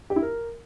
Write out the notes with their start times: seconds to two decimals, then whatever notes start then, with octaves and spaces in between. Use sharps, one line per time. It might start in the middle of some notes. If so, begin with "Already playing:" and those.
0.10 G4
0.16 E4
0.22 A#4